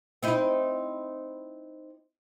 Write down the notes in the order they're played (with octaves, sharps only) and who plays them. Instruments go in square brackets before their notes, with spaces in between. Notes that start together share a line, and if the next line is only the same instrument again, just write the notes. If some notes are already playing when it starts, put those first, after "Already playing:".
[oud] C4 D#4 E4